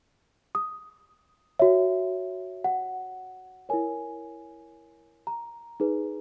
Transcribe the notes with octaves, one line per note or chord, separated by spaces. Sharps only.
D#6
F#4 C#5 E5
F#5
E4 A#4 C#5 G#5
A#5
D#4 G#4 B4